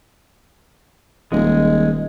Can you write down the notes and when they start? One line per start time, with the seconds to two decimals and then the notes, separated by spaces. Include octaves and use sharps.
1.32 D#1 G#3